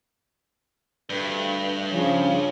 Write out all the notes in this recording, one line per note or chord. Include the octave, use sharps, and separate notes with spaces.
D2 G2 A3 B4
C#3 F3 C#5